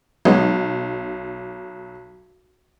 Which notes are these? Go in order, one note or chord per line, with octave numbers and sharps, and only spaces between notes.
B1 F#3 G#3 B3